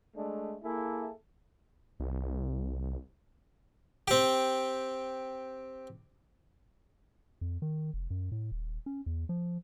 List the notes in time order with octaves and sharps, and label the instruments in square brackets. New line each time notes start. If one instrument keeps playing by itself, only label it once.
[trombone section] G#3 A3 D4
A#3 E4 G#4 A4
[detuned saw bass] C2
[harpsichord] C4 G4
[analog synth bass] F2
D#3
F1
F#2
A2
D#1
C#4
E2
F3